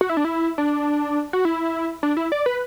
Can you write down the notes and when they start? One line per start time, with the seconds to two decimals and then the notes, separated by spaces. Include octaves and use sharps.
0.01 F#4
0.09 E4
0.17 D4
0.25 E4
0.58 D4
1.33 F#4
1.45 E4
2.03 D4
2.17 E4
2.32 D5
2.46 B4